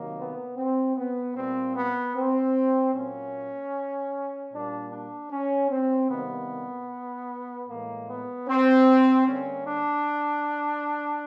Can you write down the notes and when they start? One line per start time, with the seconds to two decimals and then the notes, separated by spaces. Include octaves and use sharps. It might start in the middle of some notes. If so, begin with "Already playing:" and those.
Already playing: C3 D#3 F#3 A#3
0.17 B3
0.57 C4
0.97 B3
1.36 A#2 G3 A#3 C4
1.75 B3
2.15 C4
2.94 A#2 F#3 A#3 C#4
4.52 A#2 G3 A#3 D4
4.92 D4
5.31 C#4
5.71 C4
6.10 C3 D#3 G3 A#3 B3
7.68 A2 E3 G#3 A#3
8.08 B3
8.48 C4
9.27 D3 G3 A#3 C#4
9.66 D4